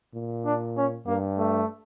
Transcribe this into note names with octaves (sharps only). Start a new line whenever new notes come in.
A#2
D4
C#4
G2 A#3
A3